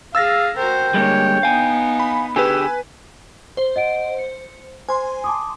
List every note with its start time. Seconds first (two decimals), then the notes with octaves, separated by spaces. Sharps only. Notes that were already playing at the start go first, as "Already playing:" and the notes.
0.15 G#4 F5 E6 A6 A#6
0.57 F#4 A#4 C5 G5
0.94 D3 G3 G#3 A#3 C#5
1.43 B3 D#4 F5 G#5
2.00 B5
2.36 D3 G4 G#4 B4 G#5 E6
3.57 C5
3.76 D#5 F#5 D7
4.18 C#7
4.89 C5 G#5 C6
5.24 A5 D6 D#6